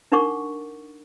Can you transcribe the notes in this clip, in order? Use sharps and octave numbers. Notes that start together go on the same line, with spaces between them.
D4 D#4 A#4 F#5 C#6 D6